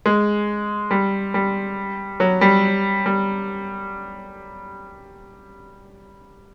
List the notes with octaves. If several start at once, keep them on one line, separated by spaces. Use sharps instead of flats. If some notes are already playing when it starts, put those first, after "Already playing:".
G#3
G3
G3
F#3
G3
G3